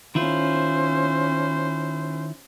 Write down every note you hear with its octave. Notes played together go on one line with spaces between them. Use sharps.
D#3 C#4 E4 F4 C5